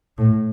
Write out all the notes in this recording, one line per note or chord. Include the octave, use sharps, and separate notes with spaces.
A2